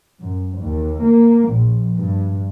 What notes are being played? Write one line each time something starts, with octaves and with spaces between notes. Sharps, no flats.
F#2
D#2
A#3
A#1
G2